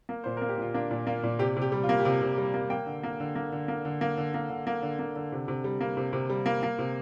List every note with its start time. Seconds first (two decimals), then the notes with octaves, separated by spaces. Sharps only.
0.09 A#3
0.24 A#2 C5
0.37 A#3 A#4
0.49 G4
0.58 A#2 F4
0.74 A#3 D4
0.91 A#2
1.07 A#3 F4
1.23 A#2
1.39 C3 G4
1.56 C3
1.62 G4
1.72 G3
1.83 F4
1.89 A#3
1.99 G4
2.05 C3 F4
2.21 C3
2.38 G3
2.54 A#3
2.70 A#3 G5
2.86 D3
3.03 A#3
3.20 D3
3.35 A#3
3.52 D3
3.68 A#3
3.85 D3
4.01 A#3
4.17 D3
4.34 A#3
4.50 D3
4.67 A#3
4.83 D3
4.99 A#3
5.16 D3
5.32 C3
5.48 C3
5.64 G3
5.81 A#3
5.97 C3
6.13 C3
6.30 G3
6.46 A#3
6.63 A#3
6.79 C3